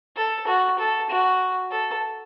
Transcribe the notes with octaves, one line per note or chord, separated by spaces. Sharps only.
A4
F#4
A4
F#4
A4